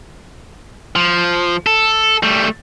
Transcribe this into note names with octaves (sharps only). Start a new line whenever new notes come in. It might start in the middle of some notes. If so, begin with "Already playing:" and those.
F3
A4
G3 A3